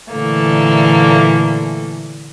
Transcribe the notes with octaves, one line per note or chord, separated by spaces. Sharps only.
A#2 D3 E3 A3 A#3 A4